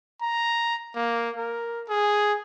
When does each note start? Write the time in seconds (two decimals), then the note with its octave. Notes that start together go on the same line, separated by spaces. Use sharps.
0.22 A#5
0.95 A#3
1.37 A#4
1.88 G#4